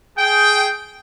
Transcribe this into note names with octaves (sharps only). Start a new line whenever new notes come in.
G#4 G5